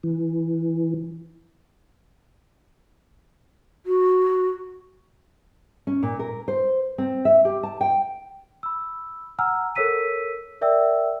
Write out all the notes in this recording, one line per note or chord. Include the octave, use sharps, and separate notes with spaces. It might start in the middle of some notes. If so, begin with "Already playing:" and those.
E3
F#4
C#4
A#2
A#4
C5
C4
E5
G4
A5
G5
B5 E6
F#5 G#5 A#5 E6 F6
A4 A#4 C#5 E6 B6 D#7
A#4 D5 E5 G5 E6